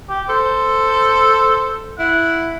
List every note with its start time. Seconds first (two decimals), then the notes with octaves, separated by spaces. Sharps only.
0.10 G4
0.29 A4 C5
1.99 E4 F#5